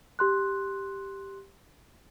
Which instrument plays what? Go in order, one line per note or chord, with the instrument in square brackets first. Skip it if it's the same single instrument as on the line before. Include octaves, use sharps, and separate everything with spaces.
[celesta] G4 C6 F#6